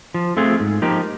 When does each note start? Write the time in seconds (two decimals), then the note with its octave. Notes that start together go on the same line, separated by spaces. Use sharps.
0.14 F3
0.37 A3 C4 F4 G#4
0.60 G#2
0.82 F3 A#3 D#4 G4